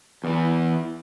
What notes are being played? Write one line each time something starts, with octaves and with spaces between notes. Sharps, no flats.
E2 E3